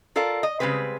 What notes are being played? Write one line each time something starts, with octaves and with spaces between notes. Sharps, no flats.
F4 A4 A#4 D5 F5
D#5
C#3 G3 G#3 C4 B4